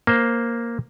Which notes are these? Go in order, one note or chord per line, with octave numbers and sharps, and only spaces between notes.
A#3 C5